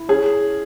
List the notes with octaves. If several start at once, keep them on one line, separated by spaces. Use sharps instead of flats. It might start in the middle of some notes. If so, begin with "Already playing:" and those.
Already playing: E4
C#4 G#4